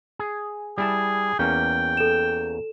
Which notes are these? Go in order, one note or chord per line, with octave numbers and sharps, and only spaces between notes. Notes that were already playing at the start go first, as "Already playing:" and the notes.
G#4
G3 E4 G#4 A5
E2 A#3 C#4 G5
A4 E7